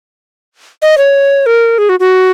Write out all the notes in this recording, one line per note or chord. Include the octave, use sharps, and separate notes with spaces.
D#5
C#5
A#4
G#4
F#4
F#4